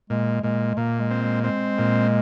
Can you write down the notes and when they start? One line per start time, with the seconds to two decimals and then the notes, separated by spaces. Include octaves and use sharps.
0.10 A#2 G#3
0.43 A#2 G#3
0.77 A#2 A#3
1.00 G#3
1.11 C4
1.22 G#3
1.44 G#3 C4
1.78 A#2